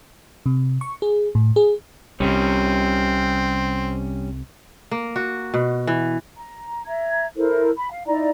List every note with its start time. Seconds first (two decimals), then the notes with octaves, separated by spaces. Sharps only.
0.46 C3
0.81 C#6
1.02 G#4
1.35 A2
1.56 G#4
2.20 C2 C3 G3 C4 C#4
4.91 A#3
5.16 F#4
5.54 B2
5.87 E3
6.38 A#5
6.86 E5 A#5 G#6
7.36 E4 A4 A#4 C5
7.77 B5
7.91 F5
8.07 D#4 E4 D5 A#5